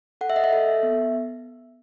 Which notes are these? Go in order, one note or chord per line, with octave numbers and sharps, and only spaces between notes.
A4 F#5
E5
D#5
E5
A4
B3